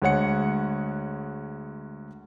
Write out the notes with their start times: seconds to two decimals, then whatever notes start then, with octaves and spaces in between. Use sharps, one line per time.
0.02 D2 G#3 C#5 F#5 C#7